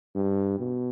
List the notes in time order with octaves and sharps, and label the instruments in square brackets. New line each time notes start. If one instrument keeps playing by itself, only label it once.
[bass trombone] G2
B2